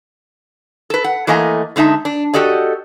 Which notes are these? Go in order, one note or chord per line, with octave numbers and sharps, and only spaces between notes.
A4 B4
F#5
E3 A3 A#3 D#5 G#5 A#5
D3 G#3 D#4 E5 A5
D4
F#4 G4 A4 D5 D#5